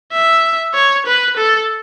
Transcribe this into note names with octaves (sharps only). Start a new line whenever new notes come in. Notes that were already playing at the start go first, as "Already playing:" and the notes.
E5
C#5
B4
A4